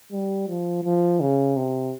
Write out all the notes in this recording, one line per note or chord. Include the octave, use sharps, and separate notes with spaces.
G3
F3
F3
C#3
C3